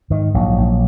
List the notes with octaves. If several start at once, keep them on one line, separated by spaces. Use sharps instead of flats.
G#2 D#3
A#1 F#3
A#1